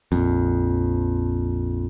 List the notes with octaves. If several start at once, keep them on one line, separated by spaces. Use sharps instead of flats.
A#1 F2